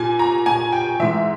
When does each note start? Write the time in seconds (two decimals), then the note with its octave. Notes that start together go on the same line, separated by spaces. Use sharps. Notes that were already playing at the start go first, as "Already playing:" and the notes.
Already playing: A#2 G#5
0.19 A#5
0.46 A#2 G#5
0.72 G5
1.00 G#2 E3 E5